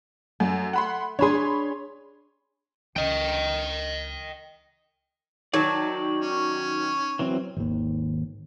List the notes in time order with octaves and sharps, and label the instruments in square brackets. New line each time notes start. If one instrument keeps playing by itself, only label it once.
[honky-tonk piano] F#2 [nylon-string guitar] A3
[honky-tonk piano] F#5 B5 C6
[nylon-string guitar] D4 G#4 [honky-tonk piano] C#5 B5 C6
[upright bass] C#2 [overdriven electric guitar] D#5 G5
[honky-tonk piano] D#3 [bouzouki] F#3 [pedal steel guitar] D5 A5
[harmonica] C#4
[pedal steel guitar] E3 F#3 C4
[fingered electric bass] G#1 D#2